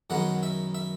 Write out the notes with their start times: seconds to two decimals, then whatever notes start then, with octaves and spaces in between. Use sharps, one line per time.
0.10 F#2 D#3 G#3 B3 F#5
0.43 E5
0.75 E5